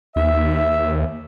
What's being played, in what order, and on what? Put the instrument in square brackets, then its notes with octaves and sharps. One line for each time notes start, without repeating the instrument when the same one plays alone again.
[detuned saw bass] D#2 [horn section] E5